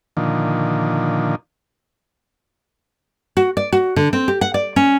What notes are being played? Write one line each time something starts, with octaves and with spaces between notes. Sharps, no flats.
A#2 D3 D#3 F3
F#4
D5
F#4
D3
C4
G4
F#5
D5
C#4